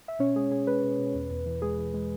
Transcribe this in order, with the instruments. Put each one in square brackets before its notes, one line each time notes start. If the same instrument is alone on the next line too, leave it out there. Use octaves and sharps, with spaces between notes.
[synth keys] E5
B2 C#4 C#5
G#3 G#4
B2 G#4
G#3 B4
B2
B2
E2
E2
E3
G#3 G#4
E3
G#3